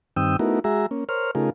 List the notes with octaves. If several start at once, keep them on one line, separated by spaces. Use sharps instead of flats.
G2 D#3 C4 G5 D#6 E6
A3 B3 D#4 E4 F#4 A#4
G#3 F#4 G#4 E5 A#5
A#3 C#4
A#4 C5 C#5 F6
C#3 A3 D#4 F4 G#4 A#4